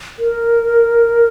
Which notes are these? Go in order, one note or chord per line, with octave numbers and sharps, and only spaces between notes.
A#4